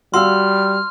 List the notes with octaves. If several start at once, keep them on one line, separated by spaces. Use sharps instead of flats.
G3 F#4 F5 C6 E6 F6